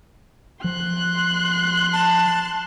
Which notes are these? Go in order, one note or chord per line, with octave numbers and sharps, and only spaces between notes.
F3 C6 F#6
A5